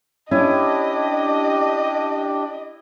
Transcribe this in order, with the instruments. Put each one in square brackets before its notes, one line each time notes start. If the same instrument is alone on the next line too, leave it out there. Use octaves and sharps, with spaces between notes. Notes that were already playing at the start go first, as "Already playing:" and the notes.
[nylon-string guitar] C#4 [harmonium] D4 G4 [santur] E4 [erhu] D#5